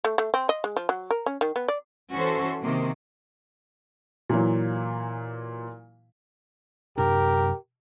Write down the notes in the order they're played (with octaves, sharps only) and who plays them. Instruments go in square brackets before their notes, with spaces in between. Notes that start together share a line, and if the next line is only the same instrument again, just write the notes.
[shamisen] A3
A3
C4
D#5
G#3
F3
F#3
A#4
C#4
D#3
B3
D5
[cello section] E3 C#4 F#4 A4 C5
C3 D#3 A#3
[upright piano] A#2 E3 F#3
[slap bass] F#2 C3 D4 [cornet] G4 [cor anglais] A#4